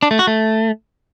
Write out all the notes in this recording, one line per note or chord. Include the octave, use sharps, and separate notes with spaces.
D4
A3
F#4
A3